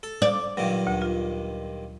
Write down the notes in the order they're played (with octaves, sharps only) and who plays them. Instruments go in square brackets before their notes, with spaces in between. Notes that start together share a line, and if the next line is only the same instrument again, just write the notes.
[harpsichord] A4
[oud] D5
[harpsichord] G2 A#2 D#3 [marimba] F#3
[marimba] D2
F4